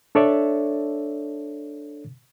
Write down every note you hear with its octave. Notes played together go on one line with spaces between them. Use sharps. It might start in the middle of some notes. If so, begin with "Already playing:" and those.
D4 A4 C#5 D5 E5